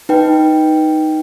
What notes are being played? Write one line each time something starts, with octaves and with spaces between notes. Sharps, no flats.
D#4 B4 G5